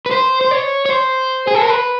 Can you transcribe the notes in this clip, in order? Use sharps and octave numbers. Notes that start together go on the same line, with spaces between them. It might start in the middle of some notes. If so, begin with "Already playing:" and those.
B4
C5
C5
C#5
C#5
C5
G#4
A4
A#4
B4